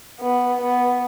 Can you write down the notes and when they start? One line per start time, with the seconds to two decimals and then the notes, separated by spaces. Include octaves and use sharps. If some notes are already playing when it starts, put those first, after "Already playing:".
0.21 B3
0.61 B3